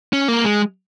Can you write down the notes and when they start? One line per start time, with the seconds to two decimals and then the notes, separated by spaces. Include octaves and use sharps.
0.13 C#4
0.28 A#3
0.44 G#3